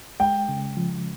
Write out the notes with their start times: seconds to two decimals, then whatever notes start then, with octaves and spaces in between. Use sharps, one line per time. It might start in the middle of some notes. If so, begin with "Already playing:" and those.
0.20 G#3 G5
0.49 C#3
0.77 F3